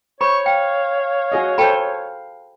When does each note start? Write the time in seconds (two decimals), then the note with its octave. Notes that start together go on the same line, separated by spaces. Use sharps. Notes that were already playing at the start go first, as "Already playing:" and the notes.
0.21 C5 C#5 B5 C#6
0.46 F5 G5
1.01 F5
1.32 F#4 G#4 D#5
1.58 A4 C5 G5 A5 B5